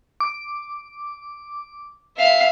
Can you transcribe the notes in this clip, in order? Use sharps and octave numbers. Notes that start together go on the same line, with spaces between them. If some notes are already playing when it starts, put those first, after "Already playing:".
D6
E5 F5